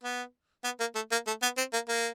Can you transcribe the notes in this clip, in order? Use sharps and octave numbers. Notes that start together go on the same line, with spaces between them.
B3
B3
A#3
A3
A#3
A3
B3
C4
A#3
A#3